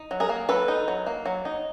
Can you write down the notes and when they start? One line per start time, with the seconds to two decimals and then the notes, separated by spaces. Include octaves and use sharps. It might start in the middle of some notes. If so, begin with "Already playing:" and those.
Already playing: D#4
0.11 F#3
0.20 G#4 A#4
0.29 A#3
0.49 F#3 A4 B4
0.68 D#4
0.88 F#3
1.06 A#3
1.25 F#3
1.45 D#4